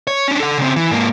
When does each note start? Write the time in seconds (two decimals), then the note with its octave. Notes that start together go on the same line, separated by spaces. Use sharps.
0.07 C#5
0.28 C#4 D4
0.40 A4 F#5
0.58 C#3 C4
0.76 E3
0.91 G#2 A#3